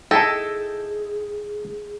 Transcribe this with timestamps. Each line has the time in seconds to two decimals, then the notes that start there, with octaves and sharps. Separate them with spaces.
0.11 D#4 E4 G#4 A4 D#5 G5 A5